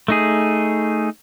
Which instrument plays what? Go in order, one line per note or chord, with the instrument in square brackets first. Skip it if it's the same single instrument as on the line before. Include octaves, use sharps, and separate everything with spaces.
[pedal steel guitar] A3 D#4 G#4